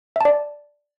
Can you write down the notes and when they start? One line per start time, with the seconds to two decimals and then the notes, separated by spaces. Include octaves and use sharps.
0.16 E5
0.21 A5
0.25 D5